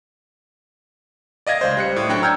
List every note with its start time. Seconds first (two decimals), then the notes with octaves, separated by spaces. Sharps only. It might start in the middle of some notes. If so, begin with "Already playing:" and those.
1.47 D5 D#5 F5 G#6 A#6
1.61 C#2 C5
1.77 G3 F#6 C#7
1.96 A2
2.09 F#3 D4 C#5 G5 F#6 C#7
2.22 A#5 E6 F6 G6 G#6